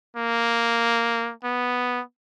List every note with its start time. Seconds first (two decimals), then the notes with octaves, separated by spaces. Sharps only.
0.17 A#3
1.44 B3